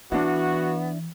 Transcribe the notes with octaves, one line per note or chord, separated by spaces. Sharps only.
E3 B3 D4 E4 F#4